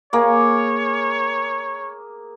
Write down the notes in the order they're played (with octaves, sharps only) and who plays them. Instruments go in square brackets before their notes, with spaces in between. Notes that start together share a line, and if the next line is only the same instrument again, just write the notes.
[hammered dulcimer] A#3 G#4 D6 [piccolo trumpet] C#5